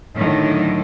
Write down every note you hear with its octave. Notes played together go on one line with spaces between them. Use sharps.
A2 D3 D#3 F#3